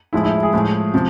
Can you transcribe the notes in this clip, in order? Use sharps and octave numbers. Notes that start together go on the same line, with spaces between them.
A2 F3 G#3 E4
E4
G#4
A2 F3 G#3
C3 F3